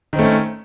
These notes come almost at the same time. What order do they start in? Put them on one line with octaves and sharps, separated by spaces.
D#3 C4 A3 C#4